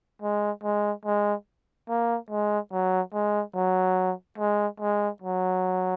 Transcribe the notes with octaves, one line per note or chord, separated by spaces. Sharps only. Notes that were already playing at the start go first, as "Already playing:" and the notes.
G#3
G#3
G#3
A#3
G#3
F#3
G#3
F#3
G#3
G#3
F#3